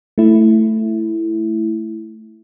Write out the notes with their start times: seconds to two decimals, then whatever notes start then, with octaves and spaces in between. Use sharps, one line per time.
0.18 A3 E4